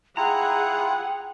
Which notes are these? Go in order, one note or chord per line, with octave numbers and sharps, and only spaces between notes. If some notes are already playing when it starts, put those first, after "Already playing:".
E4 F4 G#4 F#5 G5 A#5